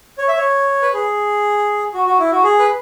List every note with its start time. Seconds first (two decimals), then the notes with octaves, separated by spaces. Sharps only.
0.18 C#5
0.28 E5
0.37 C#5
0.82 B4
0.93 G#4
1.94 F#4
2.06 F#4
2.19 E4
2.31 F#4
2.44 G#4
2.59 B4